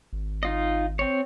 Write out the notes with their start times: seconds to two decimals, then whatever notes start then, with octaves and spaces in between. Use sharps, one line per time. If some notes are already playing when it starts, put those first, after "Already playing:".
0.13 G#1
0.43 D#4 F4 D#5
0.99 C4 C#5